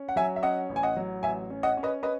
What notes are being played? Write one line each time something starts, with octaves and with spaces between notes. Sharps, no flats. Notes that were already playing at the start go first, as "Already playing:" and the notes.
Already playing: C#4
F#5
F#3 E5 G#5
E5
C#4 D#5 F#5
A1
G#5
D#5 F#5
F#3
A1 E5 G#5
C#4
D#5 F#5
C#4
B4 D#5
B4 D#5